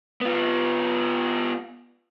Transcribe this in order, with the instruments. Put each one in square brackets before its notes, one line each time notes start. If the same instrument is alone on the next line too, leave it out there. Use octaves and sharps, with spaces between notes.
[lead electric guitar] B3 F4